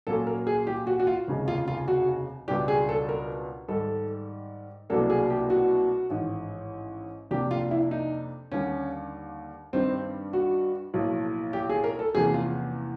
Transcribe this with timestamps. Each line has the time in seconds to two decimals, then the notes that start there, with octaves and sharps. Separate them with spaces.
0.07 A#2 F#3 A#3 C#4 F4 A4
0.27 A#4
0.47 G#4
0.67 G4
0.87 F#4
0.99 F#4
1.07 F4
1.27 F1 D#2 C#3 F3 G#3
1.48 F4
1.68 F4
1.88 F#4
2.48 C#2 B2 G3 B3 D4 G4
2.68 G#4
2.89 A4
3.09 A#4
3.68 G#2 D#3 G3 A4
4.90 C2 B2 F#3 A#3 D4 A4
5.10 G#4
5.30 G4
5.50 F#4
6.10 A1 G#2 D#3
7.31 F2 C3 F3 A#3 D4 G4
7.51 F4
7.71 E4
7.91 D#4
8.52 D#2 D3 G3 C#4
9.73 G2 D#3 G3 C4
10.33 F#4
10.94 B1 A2 F3 A#3
11.53 G4
11.69 G#4
11.84 A#4
11.99 A4
12.15 E2 C3 F3 A#3 C#4 G#4
12.34 F4